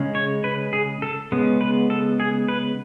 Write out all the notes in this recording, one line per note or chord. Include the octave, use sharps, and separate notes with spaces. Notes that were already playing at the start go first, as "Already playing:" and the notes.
Already playing: C#3 G#3 C#4
C#5
B4
G#4
A4
C#3 G#3 B3
B4
A4
G#4
B4